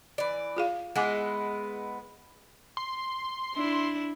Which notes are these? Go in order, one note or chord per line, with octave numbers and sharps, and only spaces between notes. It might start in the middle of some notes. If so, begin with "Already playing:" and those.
E3 D5
F4 G#4 F5
G#3 B3 E4 F#5 G#5 D6
C6
D4 E4